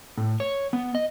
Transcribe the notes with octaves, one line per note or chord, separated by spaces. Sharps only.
A2
C#5
B3
D#5